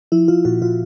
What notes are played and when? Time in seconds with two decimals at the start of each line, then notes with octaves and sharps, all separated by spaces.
0.12 F3 E4
0.28 F3 F4
0.45 A#2 F#4
0.62 A#2 F4